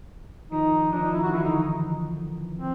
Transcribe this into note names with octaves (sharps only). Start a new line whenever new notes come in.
D#3 F3 D#4
D#3 F3 D4
D#4
E4
F#4
D3 E3 E4
D#4
D#4
C4